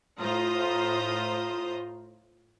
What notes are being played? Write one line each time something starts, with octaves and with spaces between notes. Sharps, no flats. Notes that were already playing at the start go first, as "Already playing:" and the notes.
A2 F4 C5 A#5 D#6